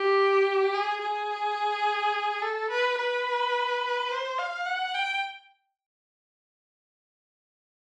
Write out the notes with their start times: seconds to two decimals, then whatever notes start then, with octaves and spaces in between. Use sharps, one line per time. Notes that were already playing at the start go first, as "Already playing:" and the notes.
Already playing: G4
0.74 G#4
1.02 G#4
2.42 A4
2.70 B4
2.98 B4
4.11 C5
4.38 F5
4.66 F#5
4.94 G5